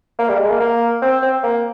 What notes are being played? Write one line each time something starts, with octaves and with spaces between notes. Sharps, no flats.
A#3
G3
G#3
A#3
A#3
C4
C4
A#3